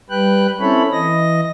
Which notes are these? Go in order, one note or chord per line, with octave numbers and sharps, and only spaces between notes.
G3 B4 G5 F#6
C4 C#4 E4 A4 C#5 B5
E3 D#5 A#6